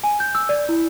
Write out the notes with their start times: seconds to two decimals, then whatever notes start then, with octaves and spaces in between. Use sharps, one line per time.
0.04 G#5
0.20 G6
0.35 E6
0.49 D5
0.69 E4